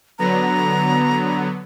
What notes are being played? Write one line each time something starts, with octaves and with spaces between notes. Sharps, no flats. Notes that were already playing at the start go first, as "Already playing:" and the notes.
D3 F#3 B3 A#5